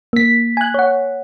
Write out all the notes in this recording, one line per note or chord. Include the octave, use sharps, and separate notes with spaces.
A#3 B6
G#5 F#6
C#5 F#5